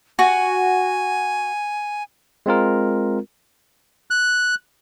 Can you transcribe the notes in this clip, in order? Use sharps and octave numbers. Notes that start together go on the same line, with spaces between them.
F#4 G#5
G#3 C4 F4 A#4
F#6